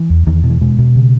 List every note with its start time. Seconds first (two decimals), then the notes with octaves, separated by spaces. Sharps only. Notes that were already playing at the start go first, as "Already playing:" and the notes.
Already playing: E3
0.10 E2
0.27 E2 D#3
0.44 B2
0.50 E3
0.61 B2 G#3
0.78 B2
0.96 C#3